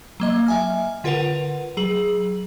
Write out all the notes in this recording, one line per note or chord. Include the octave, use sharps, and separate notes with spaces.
F#3 A#3 D#5
E5 G#5 F6
D3 F4 A#4 B4 F#5 F7
F#3 G#4 F#7